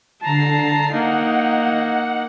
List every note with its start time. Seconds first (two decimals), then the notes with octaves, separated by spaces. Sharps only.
0.21 D3 A5 A#5 C7
0.92 A#3 D#4 F#5